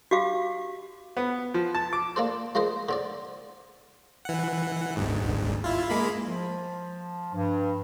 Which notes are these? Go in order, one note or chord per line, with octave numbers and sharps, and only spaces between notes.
F#4 G4 F5 D6
B3
F3
A5
D6
A#3 D4 A4 C5
F3 G#3 A#4 C5 D#5
D3 C4 D5
E3 F#5
G1 D2 G#2
E4 F4
G#3 A#3 B5
F3
G2